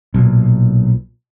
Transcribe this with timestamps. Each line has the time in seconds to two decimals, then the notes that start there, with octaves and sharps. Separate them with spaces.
0.14 B1 A#2